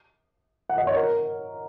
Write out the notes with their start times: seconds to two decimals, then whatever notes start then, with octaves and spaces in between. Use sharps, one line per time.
0.69 F#5
0.78 D#5
0.87 C#5
0.96 A#4